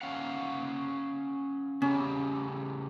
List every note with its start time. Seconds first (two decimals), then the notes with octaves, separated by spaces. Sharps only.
0.02 C#4 F5 F#5
1.82 C#3 G3 C#4